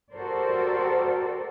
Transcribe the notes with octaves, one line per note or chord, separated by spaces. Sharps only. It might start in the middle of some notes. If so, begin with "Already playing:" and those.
F#4 G4 A4 A#4 C5 D5